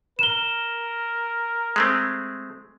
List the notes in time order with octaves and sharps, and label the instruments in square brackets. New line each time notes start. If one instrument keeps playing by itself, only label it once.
[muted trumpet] A#4 [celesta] E7 G7
[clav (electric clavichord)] G#3 A3 C4